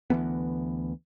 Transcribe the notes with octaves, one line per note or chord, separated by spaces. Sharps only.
D2 E3 A#3 B3